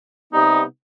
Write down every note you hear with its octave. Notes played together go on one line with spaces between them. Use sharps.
C3 G3 B3 D#4